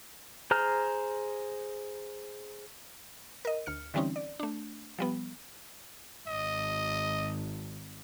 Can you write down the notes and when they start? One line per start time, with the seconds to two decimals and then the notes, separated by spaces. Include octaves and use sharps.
0.51 G#4 C5 A#5 F6
3.45 A#4 D#5
3.66 D2 F6 C#7
3.94 D3 E3 G3 C4 C#4 D#4
4.16 D5
4.39 A3 D4
4.99 F3 G3 B3
6.27 G#1 D#5